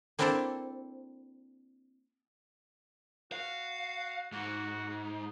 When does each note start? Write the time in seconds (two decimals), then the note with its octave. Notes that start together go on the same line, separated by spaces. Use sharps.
0.19 A#3 C4 D4 E4 A4 C5
3.32 F#4 F5
4.32 G#2 F#4